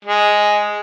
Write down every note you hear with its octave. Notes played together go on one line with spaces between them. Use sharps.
G#3